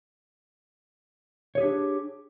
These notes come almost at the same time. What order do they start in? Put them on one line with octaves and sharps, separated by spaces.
C#5 G#4 G4 D4